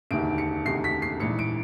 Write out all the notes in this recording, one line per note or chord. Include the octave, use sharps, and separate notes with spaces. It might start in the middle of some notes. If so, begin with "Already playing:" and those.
E1 D2 C3 D#3 D7
C#7
E1 D2 C3 D#3 C7
B6
C7
A#1 G#2 E3 C#7
D7